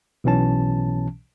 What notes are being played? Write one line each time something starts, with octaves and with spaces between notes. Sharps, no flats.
B1 B2 E3 C#4 A5